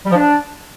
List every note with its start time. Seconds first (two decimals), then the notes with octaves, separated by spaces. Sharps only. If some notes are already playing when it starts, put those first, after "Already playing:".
0.05 G3
0.10 F3
0.15 D4